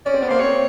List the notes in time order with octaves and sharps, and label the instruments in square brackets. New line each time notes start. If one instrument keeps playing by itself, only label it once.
[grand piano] C#4 [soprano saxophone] D5
[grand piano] C4
B3
[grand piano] A#3 [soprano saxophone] C5
[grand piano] C4 [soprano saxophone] C#5